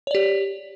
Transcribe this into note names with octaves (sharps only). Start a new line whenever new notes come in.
G4 C#5 D5